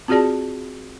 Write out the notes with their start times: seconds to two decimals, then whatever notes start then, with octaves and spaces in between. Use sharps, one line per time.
0.08 C4 F4 F#4 G#4 D5 A5